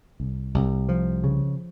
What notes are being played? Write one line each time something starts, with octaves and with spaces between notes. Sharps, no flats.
C2
C2
F3
C#3